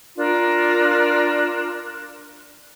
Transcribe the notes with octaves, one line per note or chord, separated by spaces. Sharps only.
D4 F4 A#4